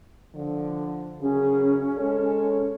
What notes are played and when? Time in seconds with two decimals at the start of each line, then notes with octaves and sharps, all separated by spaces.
0.35 D3 F3
1.21 F#2 C#3 C#4 G#4
1.98 G#3 A4 C#5